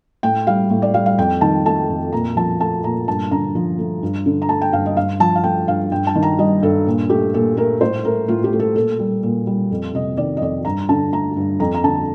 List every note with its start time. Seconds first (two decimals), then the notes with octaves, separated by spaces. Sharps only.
0.23 A2 G5
0.47 G3 F5
0.70 A2
0.82 D5
0.94 G3 F5
1.06 F5
1.18 F2 G5
1.41 D#3 A5
1.65 A3 A5
1.89 F2
2.13 A#2 A#5
2.36 F3 A5
2.61 A3 A5
2.84 A#2 A#5
3.08 G2 A5
3.31 D3 A#5
3.55 F3
3.78 A3
4.03 G2
4.26 D3
4.42 A#5
4.49 A3 A5
4.61 G5
4.73 G2 F5
4.86 D#5
4.96 G2 F5
5.20 F3 A5
5.35 F5
5.44 A3 G5
5.67 G2 F5
5.91 G2 G5
6.07 A5
6.15 D#3
6.23 A#5
6.38 G3 D#5
6.62 G2 A4
6.86 A#2
7.10 A3 G4
7.34 A#2 A4
7.57 A3 A#4
7.81 A2 C5
8.05 A3 A#4
8.28 A2 F4
8.44 G4
8.53 A3
8.60 A4
8.76 A#2 A4
8.99 G3
9.23 A#2
9.47 G3
9.71 F2
9.94 C3 D#5
10.17 D#3 D5
10.37 D#5
10.41 F2 D5
10.65 G2 A#5
10.89 D3 A5
11.12 A3 A#5
11.37 G2
11.59 F2 A#5
11.75 A#5
11.84 D3 A5